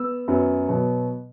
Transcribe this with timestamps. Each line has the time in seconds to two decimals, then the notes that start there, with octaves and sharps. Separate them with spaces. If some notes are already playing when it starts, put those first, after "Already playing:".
Already playing: B3 E6
0.28 F#2 F#3 B3
0.69 B2 F#3 B3